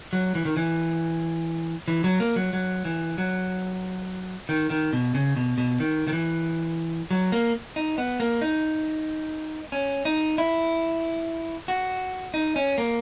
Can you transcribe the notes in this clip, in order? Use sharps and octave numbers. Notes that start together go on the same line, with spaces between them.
F#3
E3
D#3
E3
E3
F#3
A#3
F#3
F#3
E3
F#3
D#3
D#3
B2
C#3
B2
B2
D#3
D#3
E3
F#3
A#3
D#4
B3
A#3
D#4
C#4
D#4
E4
F#4
D#4
C#4
A#3